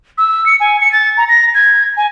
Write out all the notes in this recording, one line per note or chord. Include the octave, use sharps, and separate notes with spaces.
E6
C#7
G#5
C#7
A6
A#5
A#6
G#6
G#5